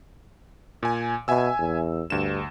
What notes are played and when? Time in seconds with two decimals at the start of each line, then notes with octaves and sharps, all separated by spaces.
0.83 A#2 G#5
1.28 B2 E5 G#5 E6
1.59 E2
2.10 D2 G2 E7